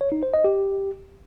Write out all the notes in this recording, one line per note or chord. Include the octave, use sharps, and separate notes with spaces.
C#5
D#4
C5
D#5
G4